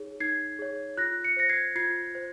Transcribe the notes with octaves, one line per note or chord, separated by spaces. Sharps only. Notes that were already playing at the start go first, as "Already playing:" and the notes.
Already playing: D#4 G#4 C#5
D#4 G#6 C7
G#4 C#5
F4 F#6 A#6
C#7
C5 A#6 C#7
G#6 C7
F4 G#6 C7
C5